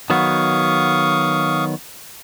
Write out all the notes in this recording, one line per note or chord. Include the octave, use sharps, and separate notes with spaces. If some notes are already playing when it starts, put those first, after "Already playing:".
D#3 F#3 B3 F5 C#6 D#6